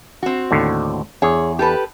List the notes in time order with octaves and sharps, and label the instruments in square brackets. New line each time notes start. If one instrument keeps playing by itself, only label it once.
[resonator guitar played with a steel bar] C4 F#4
[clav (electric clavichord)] D#2 A2 D3
[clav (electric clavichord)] E2 [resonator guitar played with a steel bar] G#4 C#5
[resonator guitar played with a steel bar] G4 A4 B4